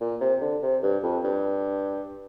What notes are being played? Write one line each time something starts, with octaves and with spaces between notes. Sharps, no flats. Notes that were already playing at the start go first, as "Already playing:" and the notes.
A#2
C3
D3
C3
G2
F2
G2